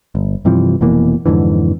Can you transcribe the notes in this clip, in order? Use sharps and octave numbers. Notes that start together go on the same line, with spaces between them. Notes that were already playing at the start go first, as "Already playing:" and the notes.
G1
G2 C3 E3 F3
F1 B2 E3 A#3
F2 G#2 D3 E3